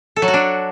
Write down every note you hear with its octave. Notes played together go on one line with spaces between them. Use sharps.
A4
F#3
F#4
D4